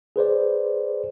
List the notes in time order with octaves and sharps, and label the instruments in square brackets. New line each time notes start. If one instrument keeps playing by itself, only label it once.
[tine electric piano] G#4 B4 C5 D5